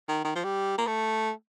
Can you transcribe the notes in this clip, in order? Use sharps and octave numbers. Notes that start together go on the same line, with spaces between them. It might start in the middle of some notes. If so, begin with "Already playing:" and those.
D#3
D#3
F3
G3
A#3
A3